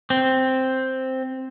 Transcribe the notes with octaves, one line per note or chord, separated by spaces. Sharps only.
C4